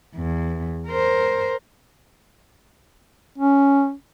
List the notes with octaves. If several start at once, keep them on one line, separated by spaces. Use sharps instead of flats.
E2
A#4 C5
C#4